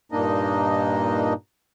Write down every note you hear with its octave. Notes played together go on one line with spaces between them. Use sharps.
G2 A#2 A#3 D4 D#4 D#5